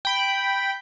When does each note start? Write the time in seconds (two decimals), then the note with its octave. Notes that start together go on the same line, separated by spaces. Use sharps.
0.05 G5 B5